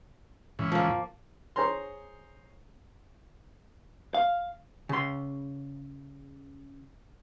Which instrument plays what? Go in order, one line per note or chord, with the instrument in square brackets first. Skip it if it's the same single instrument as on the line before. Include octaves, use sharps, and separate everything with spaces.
[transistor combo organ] G#2 C#3 E3
[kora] F3 A#3
[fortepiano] G#4 C5 C#5 A#5 C6
[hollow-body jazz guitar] F5
C#3 C6